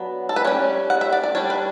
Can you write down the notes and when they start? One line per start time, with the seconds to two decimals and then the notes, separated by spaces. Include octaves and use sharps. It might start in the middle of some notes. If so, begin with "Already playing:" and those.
Already playing: F#3 B3 D4
0.29 A4
0.36 B4
0.45 G3 C#4 C#5
0.90 F#5
1.01 E5
1.13 D5
1.24 D5
1.35 G3 D4 C#5
1.50 B4